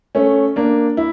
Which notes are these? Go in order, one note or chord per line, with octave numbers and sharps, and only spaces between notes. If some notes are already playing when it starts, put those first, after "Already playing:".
A3 C#4
A#3 D4
E4